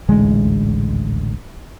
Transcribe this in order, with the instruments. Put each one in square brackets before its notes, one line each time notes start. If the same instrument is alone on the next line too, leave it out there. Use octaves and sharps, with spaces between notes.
[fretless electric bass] D#1 A1 D2 G#3